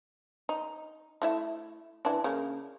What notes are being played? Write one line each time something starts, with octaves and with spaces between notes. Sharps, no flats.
D#4
A3 E4 E5
E3 D4
C#3 A#3